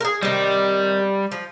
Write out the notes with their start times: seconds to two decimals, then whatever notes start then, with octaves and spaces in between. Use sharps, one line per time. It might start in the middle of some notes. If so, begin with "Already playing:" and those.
0.01 G#4 A#4
0.23 C3 D#3 G3
1.32 F3